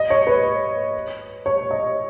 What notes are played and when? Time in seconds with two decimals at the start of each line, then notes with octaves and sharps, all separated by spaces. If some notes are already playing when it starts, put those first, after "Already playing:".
Already playing: D#5
0.10 C#5
0.27 B4
1.46 C#5
1.71 D#5